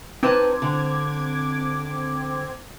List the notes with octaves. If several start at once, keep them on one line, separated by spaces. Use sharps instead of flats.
C4 D#4 B4 A5 D6 G#6
D3